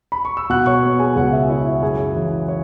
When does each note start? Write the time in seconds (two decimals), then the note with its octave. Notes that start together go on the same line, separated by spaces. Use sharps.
0.12 B5
0.25 C#6
0.37 E6
0.50 B2 F#5 F#6
0.66 C#5 C#6
0.83 B3
0.99 G#4 G#5
1.16 C#2 F#4 F#5
1.32 E5
1.49 E4 C#5
1.67 E5
1.82 F#2 G#4 G#5
2.15 E3
2.48 C#5